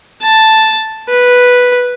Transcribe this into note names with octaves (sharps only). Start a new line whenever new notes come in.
A5
B4